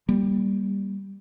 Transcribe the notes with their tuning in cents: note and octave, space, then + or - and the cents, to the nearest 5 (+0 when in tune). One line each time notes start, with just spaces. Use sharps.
G3 +0 A#3 +25